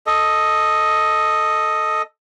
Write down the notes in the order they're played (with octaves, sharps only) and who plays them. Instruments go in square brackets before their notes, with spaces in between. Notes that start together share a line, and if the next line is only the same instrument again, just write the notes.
[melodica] A4 D#5